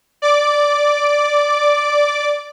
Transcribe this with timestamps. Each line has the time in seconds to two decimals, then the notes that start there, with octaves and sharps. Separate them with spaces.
0.22 D5 D6